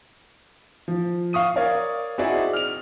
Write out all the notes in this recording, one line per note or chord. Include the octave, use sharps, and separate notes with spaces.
F3
F5 C#6 D#6 D#7
A#4 C#5 D5 F5
C4 D#4 E4 F#4 G#4 D5
F6 F7